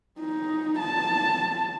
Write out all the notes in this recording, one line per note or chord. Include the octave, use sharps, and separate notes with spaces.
D#4
A5